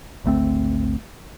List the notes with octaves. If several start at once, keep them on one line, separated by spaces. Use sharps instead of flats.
G#1 D2 A3 C4